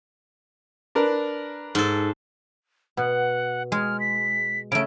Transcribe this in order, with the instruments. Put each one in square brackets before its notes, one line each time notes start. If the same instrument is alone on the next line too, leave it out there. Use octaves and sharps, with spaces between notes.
[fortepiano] D4 A#4 B4
[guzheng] G#2 A4
[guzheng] B2 [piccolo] F#5
[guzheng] G#3 [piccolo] F6
[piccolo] B6
[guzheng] C#3 A3 [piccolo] D7